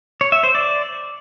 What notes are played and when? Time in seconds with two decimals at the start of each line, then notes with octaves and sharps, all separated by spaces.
0.21 C#5
0.32 E5
0.43 C5
0.55 D5